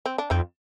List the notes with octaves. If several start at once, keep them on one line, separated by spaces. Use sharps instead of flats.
C4
D4
F2 C4 D#4